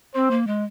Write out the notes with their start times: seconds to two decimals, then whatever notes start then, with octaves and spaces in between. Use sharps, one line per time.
0.14 C4 C5
0.31 A#3
0.47 G#3